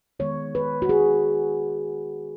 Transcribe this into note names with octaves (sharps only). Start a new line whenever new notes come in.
D#3 G#3 B3 C#5
B4
F#4
G#4